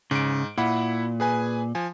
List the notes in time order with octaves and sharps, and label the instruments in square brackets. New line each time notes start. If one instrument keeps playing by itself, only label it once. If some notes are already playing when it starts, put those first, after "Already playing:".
[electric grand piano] G#2 D7 [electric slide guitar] C#3
[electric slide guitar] A#2 [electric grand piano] E4 F#5 B5
[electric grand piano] G#4 B4 G#5
F3 G#5